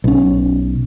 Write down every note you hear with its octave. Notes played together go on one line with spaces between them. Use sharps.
B1 C#4